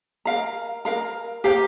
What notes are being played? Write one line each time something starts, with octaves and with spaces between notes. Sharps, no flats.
A#4 F5 A#5
A#4 F5 A#5
G4 C5 F5 A#5